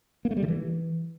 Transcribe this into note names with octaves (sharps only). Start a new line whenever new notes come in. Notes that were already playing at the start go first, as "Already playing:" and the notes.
A#3
A3
G3
D3
E3